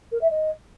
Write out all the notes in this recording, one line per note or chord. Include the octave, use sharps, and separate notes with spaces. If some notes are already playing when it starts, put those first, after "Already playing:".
A#4
E5
D#5